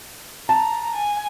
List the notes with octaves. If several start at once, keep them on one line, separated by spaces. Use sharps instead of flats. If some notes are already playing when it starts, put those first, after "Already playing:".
A5 A#5
G#5